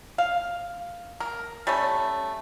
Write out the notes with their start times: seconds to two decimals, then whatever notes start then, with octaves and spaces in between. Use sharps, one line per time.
0.18 F5
1.20 A#4
1.67 G3 A3 C#4